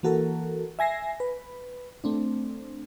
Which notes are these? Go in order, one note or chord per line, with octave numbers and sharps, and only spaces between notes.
E3 A#3 F#4 A4 A#4
E5 G#5 A#6 C7
B4
A3 C4 D4